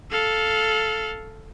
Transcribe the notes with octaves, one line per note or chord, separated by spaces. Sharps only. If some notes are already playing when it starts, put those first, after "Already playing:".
A4 F5